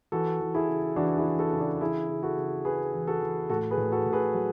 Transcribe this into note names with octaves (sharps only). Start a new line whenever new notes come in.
E3 F#4 A4
E3
E4 G#4
C#3
E3 D4 F#4
E4 G#4
E3
F#4 A4
C#3
D4 F#4
E3 E4 G#4
C#3
F#4 A4
C#3
C#3 G#4 B4
E3
F#4 A4
E3
A2 F#4 A4
G#4 B4
A2
F#4 A4
A2
G#4 B4
F#3